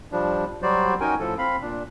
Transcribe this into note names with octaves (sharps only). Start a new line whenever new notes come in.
F3 G3 D4
F#3 G3 F#4 C5 D5
C#4 D#4 F#4 A#4 G5 G#5
A2 F3 A4
C4 F5 B5
A#2 D4